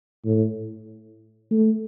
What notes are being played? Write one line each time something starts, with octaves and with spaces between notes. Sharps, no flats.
A2
A3